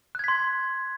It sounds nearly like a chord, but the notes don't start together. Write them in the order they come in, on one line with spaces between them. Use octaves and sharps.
F#6 G#6 B6 C6